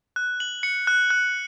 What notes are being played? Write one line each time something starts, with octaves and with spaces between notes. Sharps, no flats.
F#6
F#7
C#7
F#6
F#6